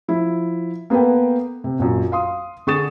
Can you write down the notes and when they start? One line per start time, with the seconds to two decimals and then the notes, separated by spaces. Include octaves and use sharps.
0.08 F3 E4
0.90 A#3 B3 A4 B4 G5
1.64 C3
1.79 A#1 F#2
2.12 F5 C6 D#6
2.67 D3 G#4 C#6 D#6 A6 E7